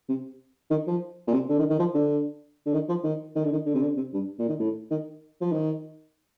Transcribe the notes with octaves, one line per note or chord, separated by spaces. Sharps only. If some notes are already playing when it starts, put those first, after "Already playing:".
C3
D#3
F3
A#2
C3
D3
D#3
D#3
F3
D3
D3
D#3
F3
D#3
D#3
D3
D#3
D3
C3
D3
C3
G2
A#2
D#3
A2
D#3
F3
D#3